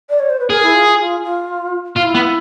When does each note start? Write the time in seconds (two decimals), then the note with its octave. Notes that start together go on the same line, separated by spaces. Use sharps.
0.10 D5
0.20 C#5
0.30 C5
0.40 B4
0.50 G#4 A#4
0.63 E4
0.75 F4
0.99 F4
1.24 F4
1.96 E4 F4
2.15 B3